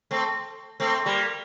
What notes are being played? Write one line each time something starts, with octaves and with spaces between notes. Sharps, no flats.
A3 C4
A3 C4
G3 A#3